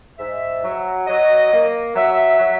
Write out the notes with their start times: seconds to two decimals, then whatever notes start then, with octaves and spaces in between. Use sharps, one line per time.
0.19 G#2 E5
0.63 F#3
1.08 F#3 D#5
1.52 A#3
1.96 F#3 E5
2.40 F#3